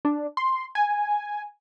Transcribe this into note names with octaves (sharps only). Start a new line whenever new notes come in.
D4
C6
G#5